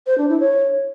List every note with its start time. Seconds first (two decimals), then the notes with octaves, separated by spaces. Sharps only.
0.07 C5
0.18 D4
0.29 E4
0.40 C#5